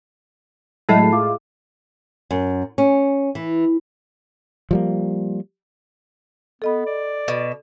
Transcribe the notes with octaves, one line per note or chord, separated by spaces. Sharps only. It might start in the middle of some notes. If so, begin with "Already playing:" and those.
A2 F#3 G#3 A3 A5 B5 C7
F4 G#4 D6
F#2
C#4
E3
F3 G3 A#3
B3 A4 D#5 B5
D5
B2